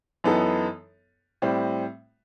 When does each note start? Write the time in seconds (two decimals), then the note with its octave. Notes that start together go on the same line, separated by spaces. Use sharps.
0.24 F#2 E3 B3 D#4 A4
1.42 A2 G3 C4